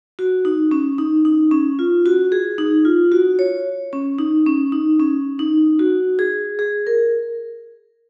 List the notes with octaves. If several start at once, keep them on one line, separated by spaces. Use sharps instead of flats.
F#4
D#4
C#4
D#4
D#4
C#4
F4
F#4
G#4
D#4
F4
F#4
C#5
C#4
D#4
C#4
D#4
C#4
D#4
F#4
G#4
G#4
A#4